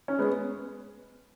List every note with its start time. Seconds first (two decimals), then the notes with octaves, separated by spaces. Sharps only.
0.08 C#4
0.19 G#3 B3